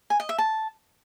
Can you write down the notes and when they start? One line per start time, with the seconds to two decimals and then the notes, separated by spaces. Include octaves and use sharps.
0.10 G#5
0.20 D#5
0.29 E5
0.38 A5